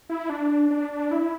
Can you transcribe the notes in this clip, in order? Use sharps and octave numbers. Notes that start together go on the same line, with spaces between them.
E4
D4
D4
D4
E4